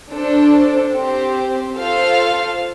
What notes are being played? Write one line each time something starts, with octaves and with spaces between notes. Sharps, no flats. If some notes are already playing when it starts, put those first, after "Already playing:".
D4 A4 C5
C4 G4 C5
F4 A4 C5 F5